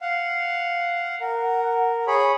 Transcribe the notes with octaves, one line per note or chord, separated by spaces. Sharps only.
F5 F#5
A#4 F#5
G#4 C#5 B5